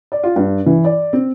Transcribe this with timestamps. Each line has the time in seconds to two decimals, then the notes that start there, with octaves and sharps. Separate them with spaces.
0.12 D5
0.23 F4
0.36 G2
0.66 E3
0.85 D5
1.13 C4